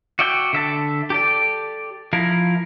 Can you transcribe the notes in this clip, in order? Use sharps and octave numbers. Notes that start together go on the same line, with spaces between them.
F#4 D5 E5 G5
D3 E5 A5
G4 A4 D5
F3 E4 A#4